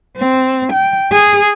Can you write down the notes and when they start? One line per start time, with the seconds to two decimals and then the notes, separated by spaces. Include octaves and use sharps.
0.17 C4
0.73 G5
1.12 G#4